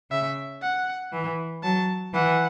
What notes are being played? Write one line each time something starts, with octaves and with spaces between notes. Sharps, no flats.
C#3 E5
F#5
E3
F#3 A5
E3 F#5